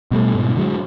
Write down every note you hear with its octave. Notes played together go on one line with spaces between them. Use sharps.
B2 G3 A3
G#2 B2
D3 F#3 G#3